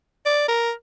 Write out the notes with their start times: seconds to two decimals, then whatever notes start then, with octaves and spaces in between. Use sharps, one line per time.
0.26 D5
0.48 A#4